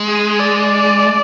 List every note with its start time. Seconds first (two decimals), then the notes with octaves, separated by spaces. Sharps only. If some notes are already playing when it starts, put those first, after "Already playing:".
Already playing: G#3
0.09 G#4
0.40 D5